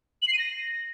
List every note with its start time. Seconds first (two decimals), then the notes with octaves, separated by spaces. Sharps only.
0.22 F#7
0.28 C7
0.33 D#7
0.39 A#6